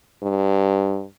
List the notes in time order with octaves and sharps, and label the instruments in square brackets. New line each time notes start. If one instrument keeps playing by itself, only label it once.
[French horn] G2